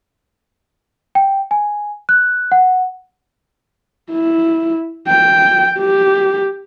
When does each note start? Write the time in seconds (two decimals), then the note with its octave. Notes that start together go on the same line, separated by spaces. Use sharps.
1.15 G5
1.51 G#5
2.09 F#6
2.52 F#5
4.12 E4
5.08 G5
5.79 G4